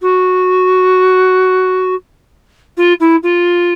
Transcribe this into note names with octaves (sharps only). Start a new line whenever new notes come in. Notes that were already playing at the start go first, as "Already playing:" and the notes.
F#4
F4
E4
F4